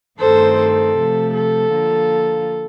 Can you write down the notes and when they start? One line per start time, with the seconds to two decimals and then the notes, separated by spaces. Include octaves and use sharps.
0.19 G2 D#3 A3 C4 A4 C5
0.57 A4
0.96 C3 F3 A3
1.34 A4
1.71 D3 F3 A#3 F4